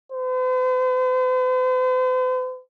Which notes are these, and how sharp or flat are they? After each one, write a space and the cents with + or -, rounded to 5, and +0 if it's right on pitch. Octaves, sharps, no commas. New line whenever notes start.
C5 -45